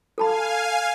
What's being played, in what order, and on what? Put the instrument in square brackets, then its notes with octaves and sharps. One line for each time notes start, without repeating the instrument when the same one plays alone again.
[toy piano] A4 A5 B5 [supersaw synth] F5 G#5